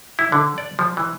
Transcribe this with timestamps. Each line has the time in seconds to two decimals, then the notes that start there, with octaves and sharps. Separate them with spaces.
0.19 E4
0.32 D3
0.58 D5
0.79 F3
0.97 E3